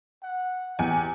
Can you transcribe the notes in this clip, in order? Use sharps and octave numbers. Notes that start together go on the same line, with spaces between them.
F#5
E2 G4 G#5